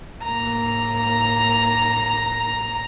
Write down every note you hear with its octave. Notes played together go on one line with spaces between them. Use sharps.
A2 A#3 A#5